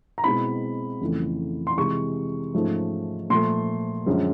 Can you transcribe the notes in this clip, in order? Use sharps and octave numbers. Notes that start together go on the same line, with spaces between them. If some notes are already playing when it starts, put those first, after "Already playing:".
A#5
B2 G#3 C4 E4 B5
F2 C#3 E3 A3
C6
C3 E3 G#3 C#6
G#2 F3 A3 C#4
A#2 F3 A3 C6
F#2 D3 F3 G#3